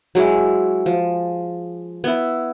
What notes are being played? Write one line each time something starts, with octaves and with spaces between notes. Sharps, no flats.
F#3 G#3 E4
F3
B3 E4